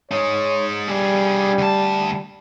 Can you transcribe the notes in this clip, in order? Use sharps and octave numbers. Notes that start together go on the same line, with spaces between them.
G#3 D#4 C#5
G3 D4 G#4
D2 A5